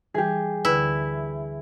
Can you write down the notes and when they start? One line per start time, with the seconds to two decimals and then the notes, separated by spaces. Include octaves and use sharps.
0.14 E3 G3 G4 G#4
0.65 D2 D3 E4 B4